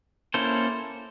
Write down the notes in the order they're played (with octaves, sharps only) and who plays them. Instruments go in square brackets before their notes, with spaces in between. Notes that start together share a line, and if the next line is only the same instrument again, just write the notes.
[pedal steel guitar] A#3 C#4 E4 A4 C5